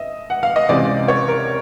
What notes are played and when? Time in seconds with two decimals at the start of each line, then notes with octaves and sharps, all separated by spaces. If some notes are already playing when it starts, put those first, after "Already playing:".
Already playing: D#5 E5
0.30 F#5
0.43 F5
0.56 D#5
0.69 C#2 C3 E3 G#3 C4 D5
1.08 C#5
1.28 A#4